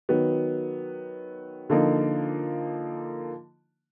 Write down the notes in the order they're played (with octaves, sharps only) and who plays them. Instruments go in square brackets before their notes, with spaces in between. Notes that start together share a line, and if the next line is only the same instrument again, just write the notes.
[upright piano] D#3 F#3 B3
D3 F3 A#3 D#4